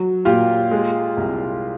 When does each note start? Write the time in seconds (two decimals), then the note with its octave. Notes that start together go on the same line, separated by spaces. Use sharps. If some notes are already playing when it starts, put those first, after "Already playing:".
Already playing: F#3
0.25 A#2 F4 G4
0.71 G#3
1.17 C2